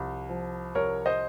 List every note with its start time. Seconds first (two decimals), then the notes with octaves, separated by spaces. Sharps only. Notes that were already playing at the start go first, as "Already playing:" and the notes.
Already playing: C2 F3
0.29 F3
0.75 C2 A#4 C#5
1.06 C5 D#5